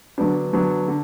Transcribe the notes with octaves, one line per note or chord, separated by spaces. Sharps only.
D3 F#3 B3 D4
D3 F#3 B3 D4
D3